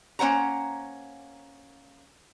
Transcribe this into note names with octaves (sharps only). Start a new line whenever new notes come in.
A#3 C#4 C5 F#5 A#5